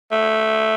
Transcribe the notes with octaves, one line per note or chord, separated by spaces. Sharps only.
A3